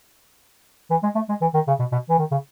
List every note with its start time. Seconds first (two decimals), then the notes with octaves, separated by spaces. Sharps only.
0.90 E3
1.03 G#3
1.15 A3
1.29 G#3
1.41 E3
1.54 D#3
1.67 C#3
1.79 B2
1.92 B2
2.09 E3
2.19 D#3
2.31 C#3